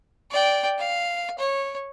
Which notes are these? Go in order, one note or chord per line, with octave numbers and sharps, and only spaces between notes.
D5 G5
F5
C#5